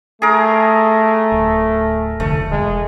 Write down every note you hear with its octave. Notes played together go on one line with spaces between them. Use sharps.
A3 G#4 A#4
D1
F1 D3 A3
E1 G#3